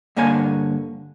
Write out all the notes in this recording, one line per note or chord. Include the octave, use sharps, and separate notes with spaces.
G2 D3 A#3 C#5 G#5